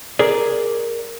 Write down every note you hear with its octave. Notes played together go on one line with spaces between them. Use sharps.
G#4 A#4 D5